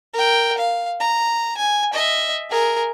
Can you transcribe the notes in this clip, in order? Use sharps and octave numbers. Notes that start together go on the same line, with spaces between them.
A#4 G5
F5
A#5
G#5
D#5 E5
G#4 A#4